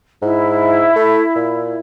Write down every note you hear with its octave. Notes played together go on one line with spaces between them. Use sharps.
G#2 E4
A3
A#2